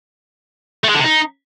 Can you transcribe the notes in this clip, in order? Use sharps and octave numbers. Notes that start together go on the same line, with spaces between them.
A3
G#3
D3
C3
D#4